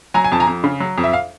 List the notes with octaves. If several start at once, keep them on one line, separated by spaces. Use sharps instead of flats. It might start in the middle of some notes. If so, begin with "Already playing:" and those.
F#3 G#5 A#5
G#5
F2 A5
G#5 A#5
F2
C#3
F#3
F2
E5
F5